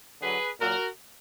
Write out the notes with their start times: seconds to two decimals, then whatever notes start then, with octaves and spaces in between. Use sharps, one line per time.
0.21 D3 F#3 G#4 B4
0.60 A#2 F#3 F#4 A#4